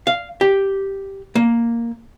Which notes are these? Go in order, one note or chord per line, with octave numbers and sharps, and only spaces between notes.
F5
G4
A#3